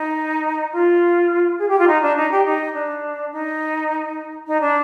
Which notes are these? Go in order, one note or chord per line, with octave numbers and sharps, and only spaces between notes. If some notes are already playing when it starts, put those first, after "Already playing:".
Already playing: D#4
F4
G#4
G4
F4
D#4
D4
D#4
G4
D#4
D4
D#4
D#4
D4